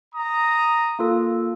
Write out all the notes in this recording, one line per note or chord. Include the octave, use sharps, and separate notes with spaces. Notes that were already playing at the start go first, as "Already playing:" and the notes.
A#5 D#6
A#3 F4 A4